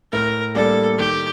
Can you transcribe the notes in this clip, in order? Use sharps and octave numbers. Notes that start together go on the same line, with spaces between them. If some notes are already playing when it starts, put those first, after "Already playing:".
A2 A#4
G3 A#3 D4 A4
D#3 G4